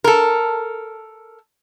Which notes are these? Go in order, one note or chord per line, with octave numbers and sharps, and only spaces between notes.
A4 A#4